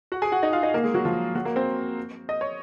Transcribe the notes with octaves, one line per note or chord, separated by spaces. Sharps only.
F#4 F#5
G#4 G#5
F#4 F#5
D#4 D#5
F4 F5
D#4 D#5
A#3 A#4
G#3 G#4
F#3 F#4
F3 F4
F#3 F#4
A#3 A#4
C4 C5
D#5
C#5